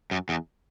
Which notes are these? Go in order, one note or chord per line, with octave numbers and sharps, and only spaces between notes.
F#2
E2